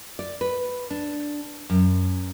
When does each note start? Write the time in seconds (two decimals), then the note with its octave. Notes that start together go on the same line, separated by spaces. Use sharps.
0.19 D5
0.41 B4
0.91 D4
1.70 F#2